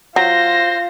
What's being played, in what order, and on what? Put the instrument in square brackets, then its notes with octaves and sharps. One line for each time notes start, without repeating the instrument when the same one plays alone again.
[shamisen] F#3 [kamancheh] F4 [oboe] C5 [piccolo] A#6